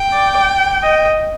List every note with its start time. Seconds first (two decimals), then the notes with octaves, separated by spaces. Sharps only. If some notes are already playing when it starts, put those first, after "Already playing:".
Already playing: G5
0.13 D5
0.83 D#5